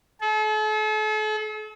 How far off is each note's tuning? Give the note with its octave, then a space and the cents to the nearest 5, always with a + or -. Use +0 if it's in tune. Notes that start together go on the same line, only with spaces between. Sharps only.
A4 -40